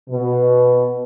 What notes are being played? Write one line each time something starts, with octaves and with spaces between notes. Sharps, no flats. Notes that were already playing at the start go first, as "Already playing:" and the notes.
B2